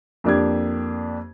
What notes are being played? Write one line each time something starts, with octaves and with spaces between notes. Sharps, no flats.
F2 A#3 D4 G4 G#6